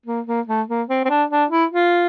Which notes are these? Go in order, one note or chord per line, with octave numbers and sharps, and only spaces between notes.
A#3
A#3
A3
A#3
C4
C4
D4
D4
E4
F4